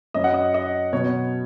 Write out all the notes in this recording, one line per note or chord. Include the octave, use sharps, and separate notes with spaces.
F#2 F#3 C#4 D#5
F#5
D#5
D#5
B2 F#3 B3 C#5